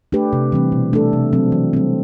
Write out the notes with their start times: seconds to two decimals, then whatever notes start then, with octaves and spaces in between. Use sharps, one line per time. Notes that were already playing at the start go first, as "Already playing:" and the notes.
0.12 A3 D4 G4 B4
0.33 C3
0.52 E3 G3 C4
0.72 B2
0.93 A3 D4 A4
1.13 C3
1.33 F#3 C4
1.52 E3
1.73 G3 C4